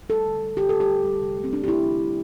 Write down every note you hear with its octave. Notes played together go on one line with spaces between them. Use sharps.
G3 A4
D3
G3
D3 G4
G3 A4
G4
D3
G3
C3
A3
C4
C3 D4
G4
A3 E4
D3
G3